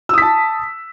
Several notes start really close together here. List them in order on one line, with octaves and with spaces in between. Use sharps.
E6 D#6 B6 A5